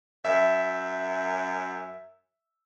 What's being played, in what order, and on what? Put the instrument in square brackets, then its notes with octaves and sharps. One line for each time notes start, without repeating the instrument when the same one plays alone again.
[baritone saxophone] F#2 [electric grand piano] E5